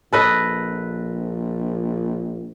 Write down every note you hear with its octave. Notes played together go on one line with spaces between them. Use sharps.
A#1 A4 B4 D#5